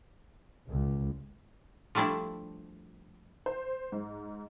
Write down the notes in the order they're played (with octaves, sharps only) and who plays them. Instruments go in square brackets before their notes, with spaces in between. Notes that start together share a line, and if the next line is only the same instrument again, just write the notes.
[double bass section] C#2
[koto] F3 G3 A3 D4 E4
[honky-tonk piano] C5
G#2